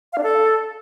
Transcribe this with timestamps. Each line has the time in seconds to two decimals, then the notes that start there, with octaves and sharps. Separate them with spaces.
0.13 F5
0.18 D4
0.23 A4